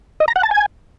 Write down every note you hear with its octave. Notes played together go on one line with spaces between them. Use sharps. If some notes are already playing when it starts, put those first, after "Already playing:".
D#5
A#5
F#5
A5
G#5